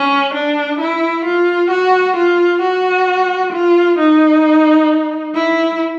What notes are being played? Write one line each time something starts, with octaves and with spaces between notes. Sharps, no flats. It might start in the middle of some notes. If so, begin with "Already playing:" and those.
Already playing: C#4
D4
E4
F4
F#4
F4
F#4
F4
D#4
E4